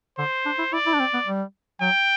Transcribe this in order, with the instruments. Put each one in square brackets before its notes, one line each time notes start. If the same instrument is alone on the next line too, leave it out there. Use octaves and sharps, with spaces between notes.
[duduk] D3 [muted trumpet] C5
[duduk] D4
E4
[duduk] E4 [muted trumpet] D5
[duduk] E4
D4
C4
B3
G3
[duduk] F#3 [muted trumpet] G5